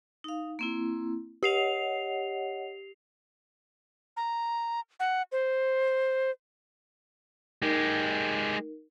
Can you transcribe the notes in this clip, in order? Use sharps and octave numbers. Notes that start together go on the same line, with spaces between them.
D#4 F5
A#3 C4 E4
G4 C#5 D#5 F#5 C7 F7
A#5
F#5
C5
G#3 D#4 G4 A#4